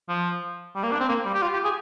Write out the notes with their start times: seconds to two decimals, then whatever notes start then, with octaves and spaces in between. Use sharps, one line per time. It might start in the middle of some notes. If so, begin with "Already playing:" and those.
0.09 F3
0.75 G3
0.83 A#3
0.92 D4
1.00 C4
1.09 A#3
1.25 G3
1.34 G4
1.42 F4
1.53 G4
1.64 G#4